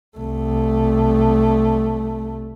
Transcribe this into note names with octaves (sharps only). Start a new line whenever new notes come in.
C2 A3